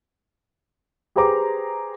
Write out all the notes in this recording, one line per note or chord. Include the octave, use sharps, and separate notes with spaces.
G4 G#4 B4 C5 A#5 D6